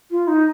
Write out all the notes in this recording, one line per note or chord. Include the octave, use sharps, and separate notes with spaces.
F4
D#4